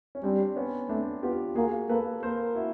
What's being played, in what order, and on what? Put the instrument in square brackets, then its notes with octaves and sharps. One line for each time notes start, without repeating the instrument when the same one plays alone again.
[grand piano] C#4
[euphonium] G3 [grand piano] C4 D4
[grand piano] B3 C#4
[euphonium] A3 [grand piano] C4 D4
[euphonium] B3 [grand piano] F4 G4
[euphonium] A#3 [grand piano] F#4 G#4
[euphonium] A#3 [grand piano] A4 B4
[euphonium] A#3 [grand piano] A#4 C5
[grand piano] E4 F#4